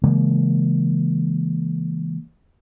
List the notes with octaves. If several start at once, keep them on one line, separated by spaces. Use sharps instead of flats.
C#3 E3 G#3 A#3